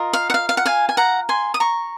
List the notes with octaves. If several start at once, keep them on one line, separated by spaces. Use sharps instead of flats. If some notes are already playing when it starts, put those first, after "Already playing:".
Already playing: F4 A#4 D#5
F5
F#5
F5
F5
F#5
F5 G#5
G#5
F#5 A#5
G#5 C6
D#6
A#5 C#6